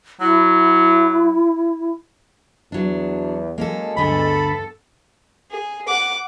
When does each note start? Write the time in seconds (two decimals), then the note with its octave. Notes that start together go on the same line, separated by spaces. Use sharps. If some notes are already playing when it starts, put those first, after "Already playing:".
0.21 F#3 E4
2.72 E2 F#3 D4
3.58 F#3 G#3 A#3 C#4 A4
3.97 D2 G2 D3 B3 A4 B5
5.51 G#4
5.87 F#5 D6